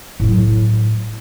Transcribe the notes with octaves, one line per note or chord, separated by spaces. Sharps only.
A2 F#3